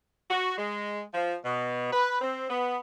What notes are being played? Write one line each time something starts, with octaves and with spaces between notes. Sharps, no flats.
F#4
G#3
F3
B2
B4
C4
B3